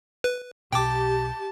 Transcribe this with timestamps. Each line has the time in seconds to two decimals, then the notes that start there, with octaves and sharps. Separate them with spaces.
0.24 B4
0.73 B1 B2 G4 G5 A5 D6